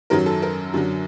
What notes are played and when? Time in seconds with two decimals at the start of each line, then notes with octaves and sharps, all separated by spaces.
0.10 F#2 D#3 F#3 A#4
0.26 A4
0.42 A#4
0.74 F#2 D3 F#3